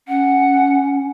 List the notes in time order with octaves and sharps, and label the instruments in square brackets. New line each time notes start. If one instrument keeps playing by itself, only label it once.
[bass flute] C#4 [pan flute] F#5